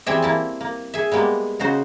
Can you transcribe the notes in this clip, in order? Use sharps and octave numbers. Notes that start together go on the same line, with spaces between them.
E3 G3 C4 G#4 E5 G5
A#3 E4 A5
A#3
G#4 E5
G3 G#3 A#3 B3
C#3 D#4 F#4 C5